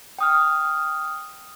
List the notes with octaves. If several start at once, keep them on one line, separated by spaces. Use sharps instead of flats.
G5 D#6 F6